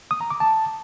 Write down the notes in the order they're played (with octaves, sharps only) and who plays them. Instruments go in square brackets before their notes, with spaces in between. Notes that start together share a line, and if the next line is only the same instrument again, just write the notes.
[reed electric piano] D#6
A#5
D6
A5